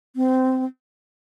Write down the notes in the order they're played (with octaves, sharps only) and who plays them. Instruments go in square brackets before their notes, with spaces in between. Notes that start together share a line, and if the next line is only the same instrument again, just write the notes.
[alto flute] C4